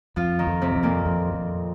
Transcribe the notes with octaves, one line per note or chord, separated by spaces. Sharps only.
F2 F3 F4
D#3 D#4
F2
C3 C4
F2
A#2 A#3
F2
F2